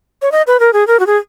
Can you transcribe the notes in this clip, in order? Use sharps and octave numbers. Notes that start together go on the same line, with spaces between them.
C#5
D#5
B4
A#4
G#4
A#4
F#4
G#4